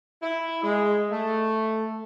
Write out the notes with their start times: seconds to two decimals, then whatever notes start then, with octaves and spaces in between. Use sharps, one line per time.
0.22 E4
0.62 G#3
1.12 A3